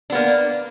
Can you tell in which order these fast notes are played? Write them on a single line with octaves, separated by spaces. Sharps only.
D4 B3 A#3